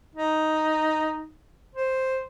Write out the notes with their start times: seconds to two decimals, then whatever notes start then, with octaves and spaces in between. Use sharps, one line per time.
0.15 D#4
1.75 C5